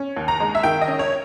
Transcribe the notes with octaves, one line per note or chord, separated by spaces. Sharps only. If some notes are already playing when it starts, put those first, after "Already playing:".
Already playing: C#4
D#2
A#5
G#3
E5
D#3 G5
D#5
C#4
C#5